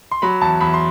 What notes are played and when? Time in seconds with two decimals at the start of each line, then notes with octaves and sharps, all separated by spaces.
0.11 C6
0.22 F#3 B5
0.41 E2 A5
0.61 E2 B5
0.74 C6